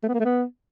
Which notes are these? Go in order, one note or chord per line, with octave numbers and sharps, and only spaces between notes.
A3
B3
A#3
A3
B3